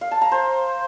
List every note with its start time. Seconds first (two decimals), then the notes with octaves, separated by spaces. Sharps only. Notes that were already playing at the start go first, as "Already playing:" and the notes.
0.01 F5
0.11 A5
0.21 A#5
0.32 C5